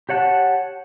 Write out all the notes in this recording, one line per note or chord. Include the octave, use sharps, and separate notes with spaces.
G4 C#5 F#5 A5 F#6